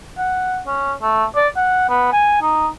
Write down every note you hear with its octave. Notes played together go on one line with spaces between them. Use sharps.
F#5
C#4
A3
D5
F#5
B3
G#5
D#4